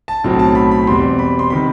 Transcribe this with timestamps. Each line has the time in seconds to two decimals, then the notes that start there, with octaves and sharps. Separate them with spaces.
0.08 A5
0.24 B1 A2 F#3 C4
0.39 A5
0.55 B5
0.71 B5
0.87 E2 B2 G3 C4 C6
1.19 B5
1.39 C6
1.50 C3 D#3 B5